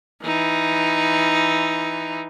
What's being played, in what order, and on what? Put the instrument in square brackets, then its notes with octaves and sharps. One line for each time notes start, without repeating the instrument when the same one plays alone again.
[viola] E3 D#4